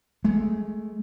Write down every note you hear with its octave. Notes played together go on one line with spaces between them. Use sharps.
G#3 A3